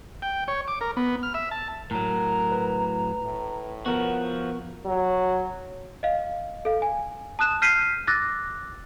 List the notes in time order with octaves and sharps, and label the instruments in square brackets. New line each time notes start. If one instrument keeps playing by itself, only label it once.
[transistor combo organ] G5
C#5
D6
A#4
B3
F6
E5
A5
[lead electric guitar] A2 F#3 [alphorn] A#4 [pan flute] A#5
[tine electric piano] B4
[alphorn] A2
[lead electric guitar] F3 F#4 [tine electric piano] B3 A#4
[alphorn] F#3
[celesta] D#5 F5
A4 F5
G#5
A5 D#6 F#6 E7
F6 G6 B6 C7 D#7
D6 E6 F#6 A6 A#6